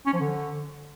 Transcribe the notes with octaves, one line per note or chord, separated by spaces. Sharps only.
C#4
F3
D3